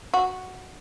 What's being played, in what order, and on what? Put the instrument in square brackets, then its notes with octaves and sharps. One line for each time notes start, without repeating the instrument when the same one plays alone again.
[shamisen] F#4